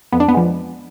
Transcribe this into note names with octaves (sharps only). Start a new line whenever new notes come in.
F2 B3
D4
B3
F3 G#3